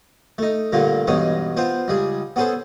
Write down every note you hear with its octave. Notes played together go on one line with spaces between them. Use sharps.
A3 D#4
G2 A#2 D3 A3 A#3
E2 G2 B2 G#3 C#4 D#4
B3 C4 F4 C5
C#2 G3 G#4
B3 C#4 G#4 A4 C5